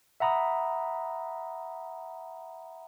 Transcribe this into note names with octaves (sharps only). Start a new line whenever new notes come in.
E5 F#5 A#5 B5 D#6